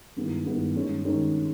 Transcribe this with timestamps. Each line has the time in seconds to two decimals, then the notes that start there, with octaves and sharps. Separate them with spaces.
0.16 G2 D#3 G#3 B3 E4
0.45 G2 D#3 G#3 B3 E4
0.75 G2 D#3 G#3 C#4
1.05 D#3 G#3 C#4